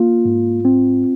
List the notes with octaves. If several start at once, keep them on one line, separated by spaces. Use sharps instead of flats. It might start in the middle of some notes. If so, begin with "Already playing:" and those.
Already playing: A#3 F4
G#2
C4